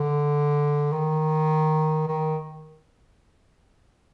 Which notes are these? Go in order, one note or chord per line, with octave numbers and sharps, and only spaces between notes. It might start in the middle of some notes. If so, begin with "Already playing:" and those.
Already playing: D3
D#3
D#3